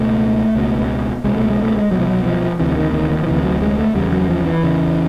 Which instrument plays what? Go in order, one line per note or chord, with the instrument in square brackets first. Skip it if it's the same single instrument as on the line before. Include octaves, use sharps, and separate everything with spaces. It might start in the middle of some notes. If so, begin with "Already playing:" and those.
Already playing: [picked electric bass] C#2 B2 A3
C#2 B2
C2 B2 G#3
A3
G#3
A3
G#3
C2 F#3
B2 F3
F#3
F3
D2 C3 E3
E3
D#3
D#3
D#3
F3
D2 C3 E3
F#3
G#3
A3
E2 C#3 G3
F#3
F3
E3
E2 C#3